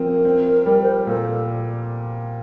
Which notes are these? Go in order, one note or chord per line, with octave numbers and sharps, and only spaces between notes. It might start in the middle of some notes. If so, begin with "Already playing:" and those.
Already playing: F3 C4 A#4
C4
G3
C5
A#4
A#2 A4